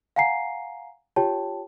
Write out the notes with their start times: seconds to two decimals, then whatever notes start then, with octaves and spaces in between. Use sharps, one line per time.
0.16 F5 F#5 G#5 A#5 C7
1.16 F4 G4 C#5 G5 A5